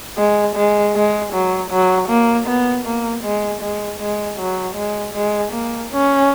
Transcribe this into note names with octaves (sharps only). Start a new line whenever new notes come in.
G#3
G#3
G#3
F#3
F#3
A#3
B3
A#3
G#3
G#3
G#3
F#3
G#3
G#3
A#3
C#4